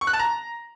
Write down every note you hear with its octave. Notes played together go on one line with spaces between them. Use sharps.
C#6
F#6
A5
A#5